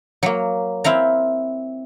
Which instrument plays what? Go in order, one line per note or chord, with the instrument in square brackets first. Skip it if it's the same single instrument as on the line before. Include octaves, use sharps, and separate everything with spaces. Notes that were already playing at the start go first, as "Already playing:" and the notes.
[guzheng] F#3 A#3
C4 E4 F5 A#5